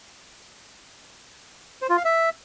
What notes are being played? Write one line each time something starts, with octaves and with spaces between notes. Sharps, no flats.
C5
F4
F5
E5